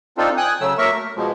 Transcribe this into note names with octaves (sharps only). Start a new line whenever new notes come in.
C4 D4 D#4 F4 A4
G5 G#5 D#6 F#6
C#3 F#3 A3 E6
F#3 A#3 A#4 E5 C#6
A3
B2 F3 G#3